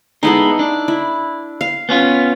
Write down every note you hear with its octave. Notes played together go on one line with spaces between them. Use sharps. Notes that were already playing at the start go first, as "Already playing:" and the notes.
G#3 B3 D#4 E4 A4
D4
E4
F5
B3 C#4 F4